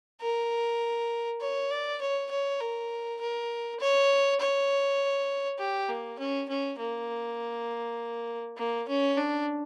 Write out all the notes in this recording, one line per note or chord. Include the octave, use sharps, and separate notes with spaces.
A#4
C#5
D5
C#5
C#5
A#4
A#4
C#5
C#5
G4
A#3
C#4
C#4
A#3
A#3
C#4
D4